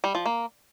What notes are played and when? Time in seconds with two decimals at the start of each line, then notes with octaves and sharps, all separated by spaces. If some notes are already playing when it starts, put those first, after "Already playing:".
0.04 G3
0.15 F3
0.26 A#3